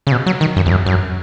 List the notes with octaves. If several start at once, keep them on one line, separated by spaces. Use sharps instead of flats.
C#3
B2
F#3
D#3
F#2
E2
F#2
F#2